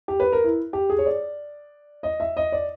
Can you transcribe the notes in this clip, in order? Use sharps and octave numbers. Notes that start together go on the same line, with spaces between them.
G4
B4
A#4
E4
G4
G#4
C#5
D5
D#5
E5
D#5
D5